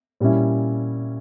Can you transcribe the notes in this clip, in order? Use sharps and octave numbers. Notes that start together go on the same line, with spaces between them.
A#2 G3 C#4 E4